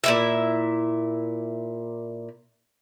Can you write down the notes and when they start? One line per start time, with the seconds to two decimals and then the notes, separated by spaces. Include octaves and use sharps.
0.04 A#2 E4 E5